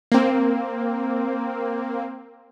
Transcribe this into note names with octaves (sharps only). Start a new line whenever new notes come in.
A#3 C4